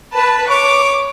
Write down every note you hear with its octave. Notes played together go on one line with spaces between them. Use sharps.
B4 A5
C#5 D6